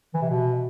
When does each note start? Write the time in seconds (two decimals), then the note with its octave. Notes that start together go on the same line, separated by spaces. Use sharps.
0.14 E3
0.22 C3
0.30 B2